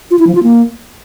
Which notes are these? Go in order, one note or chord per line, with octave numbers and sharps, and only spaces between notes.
F4
E4
F3
F4
A#3